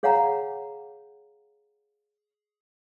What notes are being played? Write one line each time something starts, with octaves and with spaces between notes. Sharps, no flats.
G#4 C#5 F5 F#5 G#5 A#5